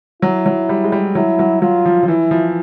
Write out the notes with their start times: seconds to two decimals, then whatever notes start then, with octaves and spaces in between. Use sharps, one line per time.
0.22 F#3 E4
0.46 F#3
0.69 G3
0.84 G#3
0.92 G3
1.15 F#3 E4
1.39 F#3
1.62 F#3 F4
1.85 F3
2.03 F3
2.08 E3 E4
2.31 F3